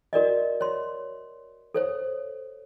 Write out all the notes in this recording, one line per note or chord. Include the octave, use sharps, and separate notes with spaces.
F#4 A#4 D5 D#5
C#5 C6
A4 C5 C#5